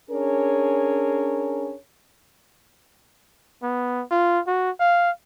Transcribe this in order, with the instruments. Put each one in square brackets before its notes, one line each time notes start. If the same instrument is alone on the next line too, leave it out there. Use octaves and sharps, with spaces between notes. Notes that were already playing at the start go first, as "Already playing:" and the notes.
[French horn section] C#4 D4 G#4 A#4 C#5
[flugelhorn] B3
F4
F#4
F5